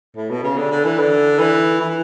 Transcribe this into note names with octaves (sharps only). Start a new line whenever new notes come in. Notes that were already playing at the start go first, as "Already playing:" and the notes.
A2
B2
C#3
D3
D3
E3
D3
E3
E3